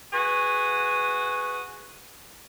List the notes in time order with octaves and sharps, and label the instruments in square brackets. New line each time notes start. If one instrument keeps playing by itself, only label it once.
[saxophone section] F#4 G#4 B4